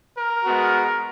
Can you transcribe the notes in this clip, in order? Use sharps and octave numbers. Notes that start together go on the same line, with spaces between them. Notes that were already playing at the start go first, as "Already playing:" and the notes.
A#4
G#3 B3 F#4